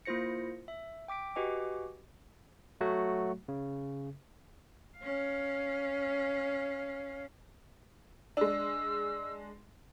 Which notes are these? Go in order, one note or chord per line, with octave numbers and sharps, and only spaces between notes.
A#3 E4 F4 C5 A#6 C#7
E5
G5 D6 B6 D7
F#4 G4 B4 D#5 G#5 D6
F#3 A3 F#4
C#3
C#4 F5
G#3 D4 E6